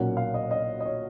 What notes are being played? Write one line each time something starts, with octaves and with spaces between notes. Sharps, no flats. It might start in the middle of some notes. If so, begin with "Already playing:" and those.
Already playing: B1 A#2 F#3 A#3 C#4 F#5
F5
D#5
D#5
D#5
C#5